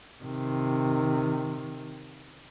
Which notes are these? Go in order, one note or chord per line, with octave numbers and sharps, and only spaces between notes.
C3 D#3